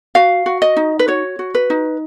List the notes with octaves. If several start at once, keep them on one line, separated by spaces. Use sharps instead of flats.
F#4 F5
F#4
D#5
D#4
B4
F#4 C#5
F#4
B4
D#4